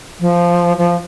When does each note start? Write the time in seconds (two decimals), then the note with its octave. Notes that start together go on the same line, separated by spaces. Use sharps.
0.21 F3
0.78 F3